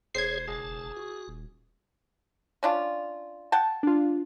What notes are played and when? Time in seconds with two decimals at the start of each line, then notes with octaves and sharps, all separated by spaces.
0.15 E1 G#4 C5 C#5 G#6 C7
0.48 F#1 G#4 A5
0.97 F#4
1.28 D#1
2.63 C#4 D4 F4
3.52 F#5 G5 A5
3.83 D4 F4